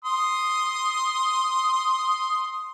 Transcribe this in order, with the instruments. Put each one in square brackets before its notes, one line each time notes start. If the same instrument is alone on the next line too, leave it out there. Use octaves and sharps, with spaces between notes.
[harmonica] C6 D#6